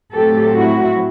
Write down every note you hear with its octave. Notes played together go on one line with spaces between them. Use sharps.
A2 F#3 A3 C4 G4 A4
E4 F#4